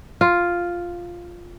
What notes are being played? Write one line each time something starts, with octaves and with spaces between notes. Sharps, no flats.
F4